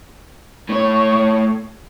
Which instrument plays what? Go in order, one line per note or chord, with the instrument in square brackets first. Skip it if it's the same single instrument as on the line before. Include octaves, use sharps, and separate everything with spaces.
[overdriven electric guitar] A2 C#5